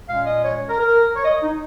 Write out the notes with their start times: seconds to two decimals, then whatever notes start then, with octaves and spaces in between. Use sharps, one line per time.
0.08 A#2 G#3 C#4 F5
0.26 D#5
0.45 C#5
0.68 A#4
0.80 A#4
1.16 C#5
1.25 D#5
1.42 D#4